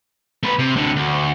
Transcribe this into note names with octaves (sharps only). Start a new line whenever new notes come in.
A3 B4
C3
A2 D3
D2